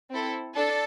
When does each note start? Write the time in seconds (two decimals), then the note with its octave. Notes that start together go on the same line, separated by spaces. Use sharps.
0.11 C4 E4 A4
0.55 D4 A4